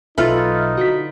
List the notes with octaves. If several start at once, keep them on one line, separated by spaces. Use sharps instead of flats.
B1 F#3 D#4 F4 A4 B4 E5 F6
D3 F#4 B6